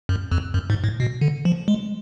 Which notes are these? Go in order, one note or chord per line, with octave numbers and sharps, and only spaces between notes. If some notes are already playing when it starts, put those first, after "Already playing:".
F#2
F2
F#2
G#2
A2
B2
D3
F3
G#3